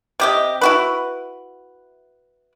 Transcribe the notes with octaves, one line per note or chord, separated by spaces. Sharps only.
C3 G4 D#5
E4 F#4 B4